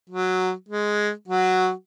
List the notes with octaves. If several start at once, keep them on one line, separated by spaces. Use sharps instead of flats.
F#3
G#3
F#3 F#4